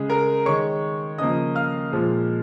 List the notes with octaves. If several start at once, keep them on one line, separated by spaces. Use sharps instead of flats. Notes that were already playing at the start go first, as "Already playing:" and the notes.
Already playing: C#3 G#3 G#4
A#4 A#5
D#3 G#3 C#5 C#6
C#3 F3 A#3 D#5 D#6
F5 F6
A#2 F3 G#3